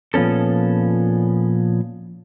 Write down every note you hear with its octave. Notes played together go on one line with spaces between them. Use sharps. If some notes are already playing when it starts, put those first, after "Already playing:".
A#2 F3 B3 C#4 A4